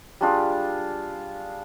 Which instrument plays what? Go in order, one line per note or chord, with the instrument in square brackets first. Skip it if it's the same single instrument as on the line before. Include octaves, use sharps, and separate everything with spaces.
[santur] G3 D4 F4 G#4